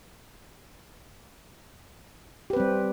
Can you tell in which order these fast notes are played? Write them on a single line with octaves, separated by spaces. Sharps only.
G4 B4 C4 G3